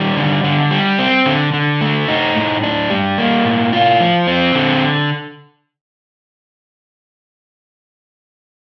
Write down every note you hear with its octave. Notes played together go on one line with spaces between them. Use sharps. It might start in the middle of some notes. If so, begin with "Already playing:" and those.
Already playing: D#3 G3
D3
D3
G3
C4
D3
D3
A3
D#4
A2
D4
G3
A#3
A2
F4
F3
C4
D3